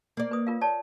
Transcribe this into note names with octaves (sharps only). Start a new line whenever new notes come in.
A#3 D5
B4 D#6
F4 A#4 F5
C#5 D5 A5